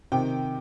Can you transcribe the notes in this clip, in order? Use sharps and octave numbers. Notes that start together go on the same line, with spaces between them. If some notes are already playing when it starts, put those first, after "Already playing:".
C3 D#3 G5